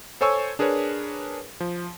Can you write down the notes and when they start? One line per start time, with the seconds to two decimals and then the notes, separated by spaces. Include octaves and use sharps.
0.21 A4 C5 C#5 G#5 C#6 E6
0.59 D4 G#4 A#4 B4 C#5
1.60 F3